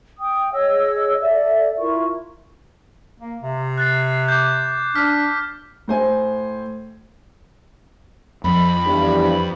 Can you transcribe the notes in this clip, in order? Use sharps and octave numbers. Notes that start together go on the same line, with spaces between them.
G5 D#6
G#4 C#5 D#5 E6
A4 D5 E5
E4 F4 A#4 C#6
A#3
C3
F#6 A6 C7
D6 G6
D4 F6 B6
A2 C5 G#5
F2 F3 B5
E2 G2